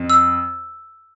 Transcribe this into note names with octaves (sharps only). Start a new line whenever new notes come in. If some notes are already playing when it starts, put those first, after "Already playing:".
Already playing: F2
E6